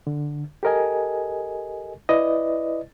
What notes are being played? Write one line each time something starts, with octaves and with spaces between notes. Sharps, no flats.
D3
G4 A4 A#4 D#5 G#5
E4 B4 D5 D#5